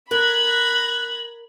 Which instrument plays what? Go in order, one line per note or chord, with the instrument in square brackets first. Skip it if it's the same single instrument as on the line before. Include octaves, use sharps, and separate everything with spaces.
[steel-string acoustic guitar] A#4 [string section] B5 G#6 A#6 [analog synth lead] F#6 [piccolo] F#7